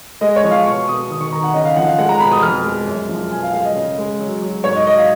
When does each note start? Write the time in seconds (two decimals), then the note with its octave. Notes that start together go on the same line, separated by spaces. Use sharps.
0.21 G#3 D#5
0.36 C#5
0.44 F3
0.51 F5
0.66 B2 C#6
0.88 B2 D#6
1.10 D#3 D#6
1.21 C#6
1.32 D#3 A#5
1.44 F#5
1.54 C#3 D#5
1.65 F5
1.76 F3 F#5
1.87 F5
1.98 G#3 F#5
2.09 A#5
2.20 B2 B5
2.32 D#6
2.42 F2 F6
2.64 G#3
2.87 F#2
3.09 F3
3.32 B2 G#5
3.43 F5
3.53 G#3 F5
3.64 D#5
3.75 C#3
3.98 G#3
4.20 F#3
4.42 F#3
4.64 G#2 C#5
4.76 D#5
4.87 F#3 D#5
4.97 F5